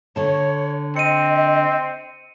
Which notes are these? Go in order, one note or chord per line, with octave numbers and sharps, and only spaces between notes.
D3 C#5 A5
C4 D#5 C#7 D#7